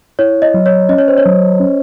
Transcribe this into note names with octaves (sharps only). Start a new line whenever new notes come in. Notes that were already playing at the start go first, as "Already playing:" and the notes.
E4 C#5
D#5
F#3
C#5
C#4 D#5
C#5
C5
C#5
F#3
C#4